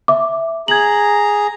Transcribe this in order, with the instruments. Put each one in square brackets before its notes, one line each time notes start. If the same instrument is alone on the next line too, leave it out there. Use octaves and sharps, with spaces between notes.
[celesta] E5 D6
[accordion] G#4 A#5 [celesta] G#6 F#7